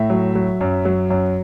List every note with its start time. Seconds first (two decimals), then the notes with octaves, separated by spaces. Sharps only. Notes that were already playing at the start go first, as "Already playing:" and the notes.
Already playing: A2 E5
0.10 F#3
0.35 F#3
0.61 F#2
0.85 F#3
1.10 F#2